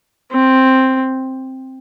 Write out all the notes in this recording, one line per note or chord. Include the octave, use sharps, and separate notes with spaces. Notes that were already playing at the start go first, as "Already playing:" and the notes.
C4